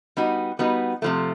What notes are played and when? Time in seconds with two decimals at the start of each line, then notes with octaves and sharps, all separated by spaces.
0.17 G3 B3 D#4 F#4
0.59 G3 B3 D#4 F#4
1.02 C3 F3 A3